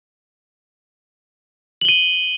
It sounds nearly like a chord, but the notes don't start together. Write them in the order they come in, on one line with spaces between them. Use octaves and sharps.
F#7 G7 D#7